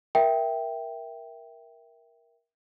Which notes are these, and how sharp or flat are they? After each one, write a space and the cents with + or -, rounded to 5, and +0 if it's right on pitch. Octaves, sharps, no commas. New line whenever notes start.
A#4 +15 E5 +0 G5 +0